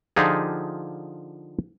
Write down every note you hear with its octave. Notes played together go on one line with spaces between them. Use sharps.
D3 F3 D#4 F4 G4 G#4